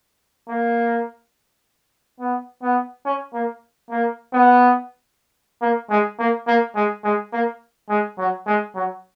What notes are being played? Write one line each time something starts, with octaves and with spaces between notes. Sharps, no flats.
A#3
B3
B3
C#4
A#3
A#3
B3
A#3
G#3
A#3
A#3
G#3
G#3
A#3
G#3
F#3
G#3
F#3